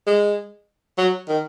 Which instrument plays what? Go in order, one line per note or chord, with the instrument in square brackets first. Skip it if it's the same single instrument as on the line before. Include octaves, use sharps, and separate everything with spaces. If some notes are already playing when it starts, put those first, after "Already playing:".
[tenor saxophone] G#3
F#3
D#3